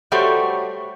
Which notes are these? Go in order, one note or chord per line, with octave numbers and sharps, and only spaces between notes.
G3 A3 F#4 G4 C5 C#5